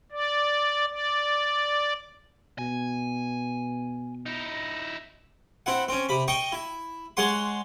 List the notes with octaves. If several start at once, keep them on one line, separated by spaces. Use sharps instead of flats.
D5
D5
B2 G#5
D#4 E4
C4 E4 F#5
C4 C#4
C3 B5
D#5 G5 C#6
E4
G#3 C#5 F#5 C6